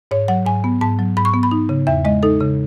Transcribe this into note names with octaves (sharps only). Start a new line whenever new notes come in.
G#2 C#5
F#3 F#5
G#2 G#5
B3
G#2 A5
F#3
G#2 B5
C#6
B3
B5
D#4
C#3
E2 E5
G#3 D#5
D#4 A4
C#3